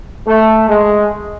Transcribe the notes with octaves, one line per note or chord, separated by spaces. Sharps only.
A3
G#3